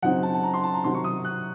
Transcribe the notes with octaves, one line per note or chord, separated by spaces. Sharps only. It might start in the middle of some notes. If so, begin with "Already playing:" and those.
F#2 C#3 F#3 C4 D#4 F#5
A5
A5
A#5
C6
A5
A#5
C3 D#3 F#3 C6
C#6
D#6
F#6